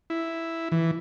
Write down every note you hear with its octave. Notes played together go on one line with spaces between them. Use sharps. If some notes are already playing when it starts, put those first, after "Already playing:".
E4
E3